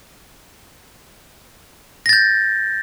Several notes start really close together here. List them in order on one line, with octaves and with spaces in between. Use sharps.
A#6 A6 G6